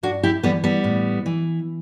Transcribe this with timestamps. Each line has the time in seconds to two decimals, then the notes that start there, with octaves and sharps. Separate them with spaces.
0.03 G2 D4 F#4
0.23 E4 G4
0.43 E3 G3 B3
0.64 G3 B3
0.84 A2
1.26 E3